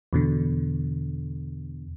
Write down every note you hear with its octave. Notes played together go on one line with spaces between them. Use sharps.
E2 B2 D3